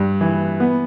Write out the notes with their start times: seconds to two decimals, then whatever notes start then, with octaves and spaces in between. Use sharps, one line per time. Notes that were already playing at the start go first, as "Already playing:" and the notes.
Already playing: G2
0.21 E3
0.60 B3